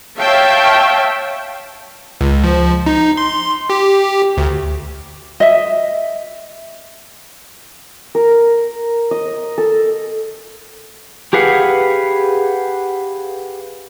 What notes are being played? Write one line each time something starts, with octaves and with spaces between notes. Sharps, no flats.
C#5 E5 F5 G5 A5
C#2
F3
D#4
C6
G4
D2
D#5 E5
A#4
D#5
A4
G4 G#4 B4 F5 F#5